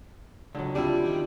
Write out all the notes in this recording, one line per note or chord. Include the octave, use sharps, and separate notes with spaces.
C#2 D3 F#3
G3 C4 D4 E4 F4
D#3